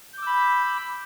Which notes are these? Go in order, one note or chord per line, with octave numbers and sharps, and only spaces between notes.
B5 D6 E6 G6